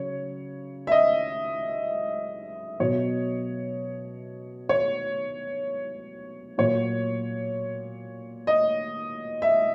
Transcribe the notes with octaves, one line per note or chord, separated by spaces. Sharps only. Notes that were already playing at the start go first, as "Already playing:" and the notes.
Already playing: C#3 F#3 C#5
E5
D#5
B2 F#3 C#5
C#5
A#2 F#3 C#5
D#5
E5